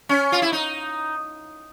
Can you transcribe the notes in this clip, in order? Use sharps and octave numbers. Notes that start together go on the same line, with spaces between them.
C#4
F4
E4
D#4